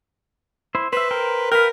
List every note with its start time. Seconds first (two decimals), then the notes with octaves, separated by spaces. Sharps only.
0.75 E4 C5
0.93 B4 C5 E5
1.11 A#4 C5 G5
1.52 A#4 B4 F5 G5